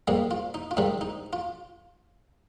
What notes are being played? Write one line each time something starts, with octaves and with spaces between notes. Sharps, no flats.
G#2 G3 A#3 D#4
F4
D#4
F4
G#2 D#3 G3 D#4
D#4
F4